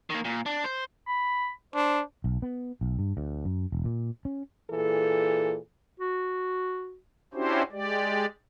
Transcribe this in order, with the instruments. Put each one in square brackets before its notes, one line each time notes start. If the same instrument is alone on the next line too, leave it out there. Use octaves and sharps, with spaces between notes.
[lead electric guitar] D#3 A#3
A#2
D4
C5
[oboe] B5
[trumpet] D4 [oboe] C5
[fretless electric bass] B1
B3
B1
G2
D2
F#2
E1
A#2
C#4
[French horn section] A#2 E3 G#4 A4
[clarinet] F#4
[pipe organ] C#4 D4 E4 F#4 G4 C5
G#3 G4 D5